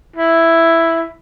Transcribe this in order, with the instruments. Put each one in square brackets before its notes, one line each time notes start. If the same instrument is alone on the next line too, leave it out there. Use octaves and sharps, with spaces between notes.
[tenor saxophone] E4